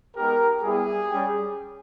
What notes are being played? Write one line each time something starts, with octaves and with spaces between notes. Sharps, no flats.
G#3 B3 D#4 G4 A#4
G3 B3 E4 G4 G#4
G3 C#4 G4